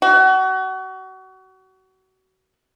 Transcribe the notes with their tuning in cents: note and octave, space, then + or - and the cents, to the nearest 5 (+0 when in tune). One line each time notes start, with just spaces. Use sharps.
F#4 +30